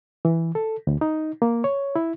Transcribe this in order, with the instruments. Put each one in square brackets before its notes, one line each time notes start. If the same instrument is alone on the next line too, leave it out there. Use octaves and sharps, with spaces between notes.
[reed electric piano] E3
A4
D2
D#4
A#3
C#5
E4